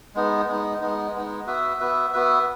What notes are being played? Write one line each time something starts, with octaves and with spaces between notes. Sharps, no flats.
G#3 B3 D#4
G#3 B3 D#4
G#3 B3 D#4
G#3 B3 D#4
B3 F#4 B4 E5
B3 F#4 B4 E5
B3 F#4 B4 E5